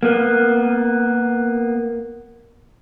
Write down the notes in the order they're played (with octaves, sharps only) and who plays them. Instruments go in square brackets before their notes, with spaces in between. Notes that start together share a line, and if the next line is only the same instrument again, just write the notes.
[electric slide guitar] A#3 B3